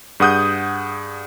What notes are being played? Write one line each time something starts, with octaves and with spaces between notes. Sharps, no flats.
G2 G#4 F#5 D#6 F#6 G6